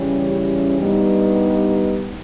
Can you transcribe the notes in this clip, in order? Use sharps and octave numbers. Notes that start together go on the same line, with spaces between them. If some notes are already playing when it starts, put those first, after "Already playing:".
Already playing: C#3 E3 G3 C#4
G2 G3 B3 D#4